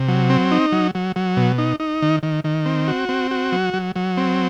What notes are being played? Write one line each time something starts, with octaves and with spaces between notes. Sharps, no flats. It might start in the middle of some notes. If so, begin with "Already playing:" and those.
Already playing: C3
F#3
C4
D#4
F#3
F#3
F#3
B2
D#4
D#4
D#3
D#3
D#3
C4
F#4
C4
F#4
F#3
F#3
F#3
C4